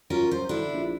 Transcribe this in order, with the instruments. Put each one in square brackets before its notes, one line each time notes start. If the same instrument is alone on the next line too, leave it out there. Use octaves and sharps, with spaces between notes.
[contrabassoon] F#2 [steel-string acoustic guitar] C#4 F4 A#4
[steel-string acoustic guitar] C5
[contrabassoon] D3 [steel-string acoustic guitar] D4 E4
[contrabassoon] A#1